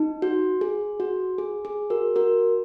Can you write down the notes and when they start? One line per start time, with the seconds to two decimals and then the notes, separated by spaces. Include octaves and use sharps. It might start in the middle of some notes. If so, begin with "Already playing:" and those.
Already playing: D#4
0.22 F#4
0.61 G#4
1.00 F#4
1.38 G#4
1.65 G#4
1.90 F#4 A#4
2.16 F#4 A#4